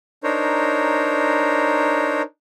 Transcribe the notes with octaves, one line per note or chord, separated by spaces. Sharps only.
D4 D#4 A#4 C5 C#5